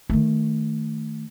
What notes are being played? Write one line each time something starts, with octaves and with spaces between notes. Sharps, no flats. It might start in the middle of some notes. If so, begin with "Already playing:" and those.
D#3 A3